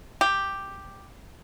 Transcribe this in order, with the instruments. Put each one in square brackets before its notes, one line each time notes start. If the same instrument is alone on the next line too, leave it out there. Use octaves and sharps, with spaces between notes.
[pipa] G4